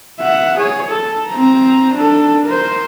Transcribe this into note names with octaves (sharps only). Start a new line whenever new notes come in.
E5 F#5
G#4 C#5
A4
C4 A#5
D4 A4
A#4 C5